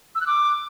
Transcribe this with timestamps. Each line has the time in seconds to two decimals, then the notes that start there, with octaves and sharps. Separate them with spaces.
0.15 E6
0.21 F#6
0.27 D6